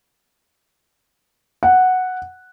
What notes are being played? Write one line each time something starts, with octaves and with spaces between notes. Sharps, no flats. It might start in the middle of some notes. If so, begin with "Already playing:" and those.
F#5